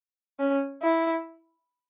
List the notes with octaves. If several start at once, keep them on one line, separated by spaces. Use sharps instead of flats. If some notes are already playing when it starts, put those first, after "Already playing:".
C#4
E4